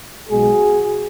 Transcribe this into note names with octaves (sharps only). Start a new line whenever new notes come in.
B1 B2 G#3 F#4 G#4